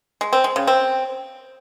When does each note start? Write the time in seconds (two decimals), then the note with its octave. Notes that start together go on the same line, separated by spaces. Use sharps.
0.21 G#3
0.33 C4
0.44 G#3
0.56 C#3
0.67 C4